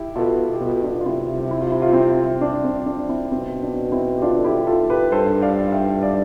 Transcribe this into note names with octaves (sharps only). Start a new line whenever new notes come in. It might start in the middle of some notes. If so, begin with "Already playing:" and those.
Already playing: E4 G4
B2 F4 A4
G4
B2 F4 A4
D4 F4
F4
C3 C4 E4
E4
F4
E4
F4
C4 E4
D4
C4
D4
C4 E4
B2 C4
D4
C4 E4
G4
D4 F4
A4
E4 G4
F4 A4
G4 B4
G2 A4 C5
D5 F5
E5 G5
D5 F5